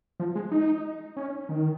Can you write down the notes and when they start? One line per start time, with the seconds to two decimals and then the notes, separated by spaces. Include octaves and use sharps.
0.20 F3
0.35 G#3
0.52 D#4
1.16 C#4
1.49 D#3